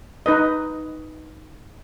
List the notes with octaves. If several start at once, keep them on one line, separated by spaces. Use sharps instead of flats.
D#4 B4 D#5